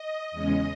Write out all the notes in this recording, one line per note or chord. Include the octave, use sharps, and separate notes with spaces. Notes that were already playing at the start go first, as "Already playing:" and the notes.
Already playing: D#5
E2 C#3 G#3 C#4